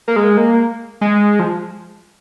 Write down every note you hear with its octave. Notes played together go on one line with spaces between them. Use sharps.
A#3
G#3
A#3
G#3
F3